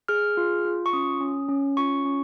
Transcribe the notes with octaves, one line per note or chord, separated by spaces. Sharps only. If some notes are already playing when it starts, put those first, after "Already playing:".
G#4 F6
F4
F4
C#6
C#4 D#6
C#4
C#4
F4 C#6
C#4